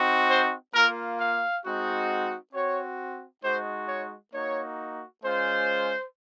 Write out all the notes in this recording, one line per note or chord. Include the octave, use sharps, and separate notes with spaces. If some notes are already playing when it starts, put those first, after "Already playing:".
Already playing: C4 D#4 F#4
C5
A#3 F4 A#4
F5
G#3 C4 D#4 F#4
C4 F#4 C#5
G#3 D#4 F#4 C5
C#5
A#3 D#4 F#4 C#5
G#3 C#4 F4 C5